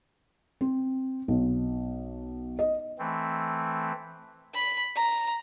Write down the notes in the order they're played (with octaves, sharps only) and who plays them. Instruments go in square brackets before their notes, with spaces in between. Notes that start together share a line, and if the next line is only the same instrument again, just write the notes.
[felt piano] C4
B1
D#5
[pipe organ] E3 A3 C4
[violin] B5
A#5